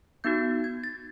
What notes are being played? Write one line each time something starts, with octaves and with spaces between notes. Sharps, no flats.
B3 D#4 F#4 G6
G#6
A6